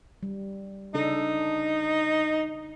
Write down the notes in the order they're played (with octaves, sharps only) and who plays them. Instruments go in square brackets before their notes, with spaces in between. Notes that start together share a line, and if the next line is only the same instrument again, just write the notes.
[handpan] G3
[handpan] C#3 D4 A4 [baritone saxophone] D#4